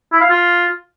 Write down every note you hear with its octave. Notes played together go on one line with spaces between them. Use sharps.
E4
F5
F4